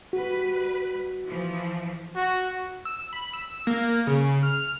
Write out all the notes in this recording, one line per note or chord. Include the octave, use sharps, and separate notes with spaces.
G3 F#4 B4
E3 F3
F#4
E6
B5
E6
A#3
C#3
F6